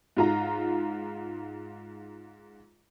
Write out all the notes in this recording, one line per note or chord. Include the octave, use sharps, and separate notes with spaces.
G#2 F4 A#5